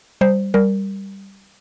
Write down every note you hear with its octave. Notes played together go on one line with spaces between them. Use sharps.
G3 C5
G3 A#4